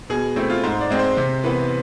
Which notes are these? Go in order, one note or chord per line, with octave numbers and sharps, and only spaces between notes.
B2 G#4
A3 C4 E4
F4
G#2 C5
D5
G#3 C4
C5
C3
E3 B3